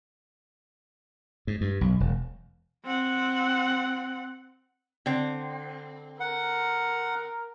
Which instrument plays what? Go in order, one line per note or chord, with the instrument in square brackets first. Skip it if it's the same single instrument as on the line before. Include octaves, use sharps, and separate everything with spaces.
[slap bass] G#2
G2
B1
E1
[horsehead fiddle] C4 F#5
[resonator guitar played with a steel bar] D3 C4
[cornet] A#4 [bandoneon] F#5